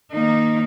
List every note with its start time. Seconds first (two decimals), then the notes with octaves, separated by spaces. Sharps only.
0.12 D#3 A#3 D#4